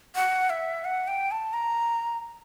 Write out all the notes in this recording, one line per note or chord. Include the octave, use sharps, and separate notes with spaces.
F#5
E5
F#5
G5
A5
A#5